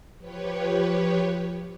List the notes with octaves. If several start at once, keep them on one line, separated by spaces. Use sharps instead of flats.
F3 G4 B4 C#5